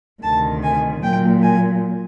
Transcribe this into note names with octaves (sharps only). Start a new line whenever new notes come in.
D2 C3 D#3 A5
G#5
A#2 F#3 A#3 G5
G#5